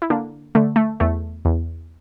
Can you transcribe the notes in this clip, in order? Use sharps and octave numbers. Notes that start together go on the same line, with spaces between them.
E4
D3 A#3 D4
D3 A3
A3
E2 A3
E2